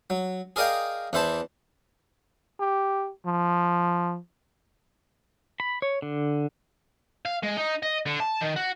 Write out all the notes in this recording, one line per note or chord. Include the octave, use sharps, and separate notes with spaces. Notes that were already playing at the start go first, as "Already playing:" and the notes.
F#3
G#4 A#4 D5 D#5 F5 G5
E2 E3 E4 C5 A5
G4
F3
B5
C#5
D3
F5
G#3
D#4
D#5
D3
A5
D#3
F#4